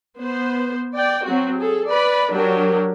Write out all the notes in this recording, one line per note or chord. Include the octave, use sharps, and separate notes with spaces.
B3 C5
D5 G5
F#3 C4 F#4
G#4 A4
B4 D5 B5
F#3 D4 G4 A#4